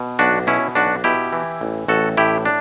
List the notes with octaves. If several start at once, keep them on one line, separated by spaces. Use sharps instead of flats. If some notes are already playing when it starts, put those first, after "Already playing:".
Already playing: B2
B1 D4 F#4
B2 C#4 E4
B1 D4 F#4
B2 E4 G4
E3
A1
A1 F#4 A4
A2 E4 G4
D4